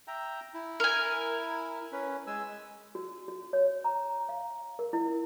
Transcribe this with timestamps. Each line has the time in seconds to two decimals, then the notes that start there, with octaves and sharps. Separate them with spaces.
0.08 E5 G5 A#5
0.54 E4
0.80 A#4 G#5
1.92 C#4 B4
2.27 G#3 G#5 E6
2.95 F#4
3.28 F#4
3.53 C#5
3.84 A#5
4.29 F5
4.79 A#4
4.93 E4